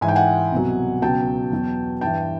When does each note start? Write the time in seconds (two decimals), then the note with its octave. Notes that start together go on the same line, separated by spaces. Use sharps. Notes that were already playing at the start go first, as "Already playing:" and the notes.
0.01 G#2 E3 G#5
0.08 G5
0.16 F#5 G#5
0.52 C2 B2 F#3
1.02 C#2 B2 F#3 G5 A5
1.52 E2 B2 F#3
2.01 G2 E3 G5 A5